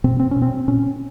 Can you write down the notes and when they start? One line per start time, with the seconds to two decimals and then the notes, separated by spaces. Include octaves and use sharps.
0.04 B2 C4
0.20 C4
0.31 C#4
0.36 B2
0.42 C4
0.68 A#2 C#4